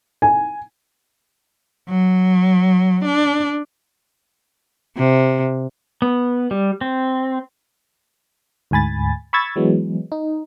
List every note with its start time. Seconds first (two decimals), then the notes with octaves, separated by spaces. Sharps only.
0.22 G#5
1.89 F#3
3.05 D4
4.97 C3
6.02 B3
6.51 G3
6.81 C4
8.71 D2 G#2 G#5 B5 A6
9.33 B5 C#6 E6 G#6 A6
9.56 E3 F#3 G#3 B3
10.12 D#4